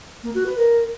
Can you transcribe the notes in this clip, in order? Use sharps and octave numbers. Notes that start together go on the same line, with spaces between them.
A#3
F#4
B4
A#4